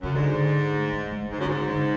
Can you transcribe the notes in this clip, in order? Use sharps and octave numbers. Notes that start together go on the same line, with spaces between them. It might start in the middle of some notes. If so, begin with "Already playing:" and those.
F#2 C#3
G#2 D3
A3
G#3
G#3
G#2 D3
F#2
G#2 D3
D3